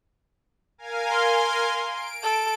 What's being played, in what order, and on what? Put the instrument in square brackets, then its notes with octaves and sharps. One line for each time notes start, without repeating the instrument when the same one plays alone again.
[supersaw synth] A#4 F5 G#5
[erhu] C6
[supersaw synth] D7
[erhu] A4